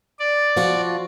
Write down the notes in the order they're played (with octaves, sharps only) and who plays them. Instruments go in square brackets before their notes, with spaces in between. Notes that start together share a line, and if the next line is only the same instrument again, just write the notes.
[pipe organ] D5
[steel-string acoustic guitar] F3 F4 F#4